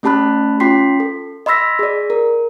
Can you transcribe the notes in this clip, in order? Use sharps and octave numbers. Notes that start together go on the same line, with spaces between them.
A3 C#4 G4 A5 B5 F#6
C#4 F4 G5 C6 B6 C7
A4
D#5 B5 C6 E6 A#6 B6
G#4 D5
A#4